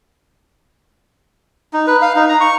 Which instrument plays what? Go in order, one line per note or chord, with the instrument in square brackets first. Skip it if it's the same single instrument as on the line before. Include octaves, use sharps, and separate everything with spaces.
[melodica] D#4
B4
F5
D#4
A#5
C#6